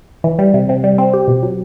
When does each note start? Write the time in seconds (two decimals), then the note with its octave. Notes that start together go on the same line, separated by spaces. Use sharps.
0.24 E3
0.39 G3
0.54 C3
0.69 C3
0.84 G3
0.98 C4
1.14 G4
1.28 B2
1.43 F#3